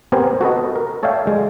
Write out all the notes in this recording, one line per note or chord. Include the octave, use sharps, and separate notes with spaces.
B3 C4 G4 A#4 C5 G#5
F#4 A4 B4 D#5
A#4
A4 C#5 D5 E5 F5 G5
G#3